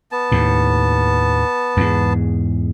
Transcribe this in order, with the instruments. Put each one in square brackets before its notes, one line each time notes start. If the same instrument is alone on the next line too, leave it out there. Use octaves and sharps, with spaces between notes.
[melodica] B3 A5
[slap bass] D#2 A2
E2 G#2